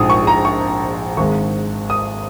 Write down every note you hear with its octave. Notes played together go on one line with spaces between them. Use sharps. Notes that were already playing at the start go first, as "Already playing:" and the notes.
Already playing: A#1 G#2 F3 D#6
C#6
A#5
C#6
G#1 G#2 D#3 G#3 C#6
D#6